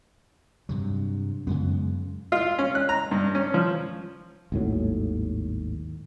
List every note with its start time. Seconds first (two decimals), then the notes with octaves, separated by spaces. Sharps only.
0.69 G2 C3 F#3
1.47 F#2 C#3 G#3 B3
2.32 F4
2.59 C#4
2.75 F#6
2.89 A#5
3.11 G2
3.35 C#4
3.54 F3
4.52 G#1 D#2 A2 F#3